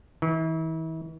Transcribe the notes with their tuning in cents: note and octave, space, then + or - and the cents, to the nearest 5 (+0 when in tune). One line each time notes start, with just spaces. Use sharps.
E3 -40